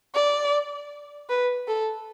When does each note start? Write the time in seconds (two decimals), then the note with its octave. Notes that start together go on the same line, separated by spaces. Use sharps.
0.15 D5
1.29 B4
1.68 A4